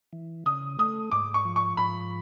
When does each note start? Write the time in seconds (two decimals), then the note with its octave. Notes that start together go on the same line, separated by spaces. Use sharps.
0.13 E3
0.46 C#3 D#6
0.78 A3 D#6
1.12 G#2 D6
1.34 C#6
1.45 F3
1.56 C#6
1.77 G#2 B5